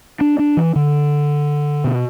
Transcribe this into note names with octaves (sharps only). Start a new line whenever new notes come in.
D4
D4
E3
D3
B2